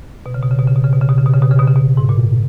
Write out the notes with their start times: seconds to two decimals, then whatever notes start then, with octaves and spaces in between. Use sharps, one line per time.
0.26 B2
0.34 C#3
0.43 B2
0.51 C#3
0.59 B2
0.67 C#3
0.76 B2
0.84 C#3
0.92 B2
1.01 C#3
1.09 B2
1.18 C#3
1.26 B2
1.34 C#3
1.42 B2
1.51 C#3
1.59 B2
1.68 C#3
1.76 B2
1.97 G#2
2.09 A#2